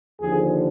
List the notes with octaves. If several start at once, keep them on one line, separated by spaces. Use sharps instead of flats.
D#2 D3 F3 A#3 G#4